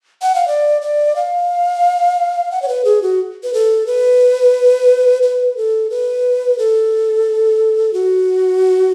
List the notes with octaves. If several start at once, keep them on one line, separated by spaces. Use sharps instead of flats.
F#5
F5
D5
D5
F5
F#5
C#5
B4
G#4
F#4
B4
A4
B4
B4
A4
B4
A4
F#4